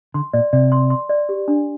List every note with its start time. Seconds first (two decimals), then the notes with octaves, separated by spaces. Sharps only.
0.14 D3 C6
0.33 A#2 D5
0.53 C3 D5
0.72 C6
0.90 C6
1.09 D5
1.29 G4
1.48 D4